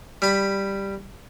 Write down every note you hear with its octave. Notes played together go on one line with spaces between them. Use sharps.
G3 B5